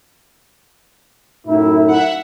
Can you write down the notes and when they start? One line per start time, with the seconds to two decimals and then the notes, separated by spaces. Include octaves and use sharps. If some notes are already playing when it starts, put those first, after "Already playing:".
1.47 F#2 A2 D#4 E4
1.90 E5 F#5